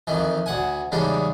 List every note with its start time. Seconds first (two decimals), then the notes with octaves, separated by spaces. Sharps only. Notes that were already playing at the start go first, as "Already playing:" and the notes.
0.07 F2 D#3 E3
0.46 D2 F#5 G#5
0.92 E2 G#2 C#3 G3 D4